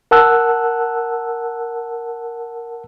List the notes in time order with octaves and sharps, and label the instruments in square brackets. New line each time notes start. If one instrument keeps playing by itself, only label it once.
[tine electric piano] A#4 F#5 A5 E6 F#6